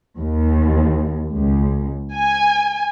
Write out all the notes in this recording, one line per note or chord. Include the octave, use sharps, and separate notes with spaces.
D#2
C#2
G#5